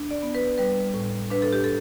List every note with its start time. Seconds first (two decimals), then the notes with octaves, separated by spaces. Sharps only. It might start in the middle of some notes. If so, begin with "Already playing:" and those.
Already playing: D4
0.11 D5
0.22 B3
0.35 B4
0.58 G3 B4
0.94 A2
1.30 D4 B4
1.42 A4
1.53 G4
1.64 A4